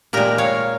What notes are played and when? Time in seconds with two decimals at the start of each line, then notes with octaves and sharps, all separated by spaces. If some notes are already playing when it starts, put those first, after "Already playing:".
0.13 A#2 G#3 G4 A#4
0.38 C#5 F5